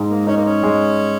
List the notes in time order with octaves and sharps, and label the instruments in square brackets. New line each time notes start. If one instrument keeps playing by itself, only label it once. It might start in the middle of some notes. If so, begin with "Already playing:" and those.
Already playing: [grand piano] G#2 G#3
[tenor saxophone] A#3
[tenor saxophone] C#4 [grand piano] D#4
[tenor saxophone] A#3
C#4
[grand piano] G#3